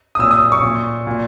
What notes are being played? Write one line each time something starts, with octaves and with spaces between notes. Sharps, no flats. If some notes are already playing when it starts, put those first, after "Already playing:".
D#6
A#2 E6
D#6
C#6
A#2
A#2